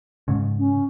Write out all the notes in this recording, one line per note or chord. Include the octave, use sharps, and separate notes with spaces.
G#2 C#3
C#4